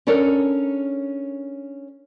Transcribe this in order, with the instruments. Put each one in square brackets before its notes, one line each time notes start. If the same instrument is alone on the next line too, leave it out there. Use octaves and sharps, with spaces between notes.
[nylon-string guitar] C#4 D4 A4 A#4 C#5